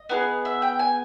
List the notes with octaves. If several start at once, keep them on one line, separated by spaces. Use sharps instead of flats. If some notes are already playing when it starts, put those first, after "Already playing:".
Already playing: D#5
B3 D#4 G#4
E5
G5
G#5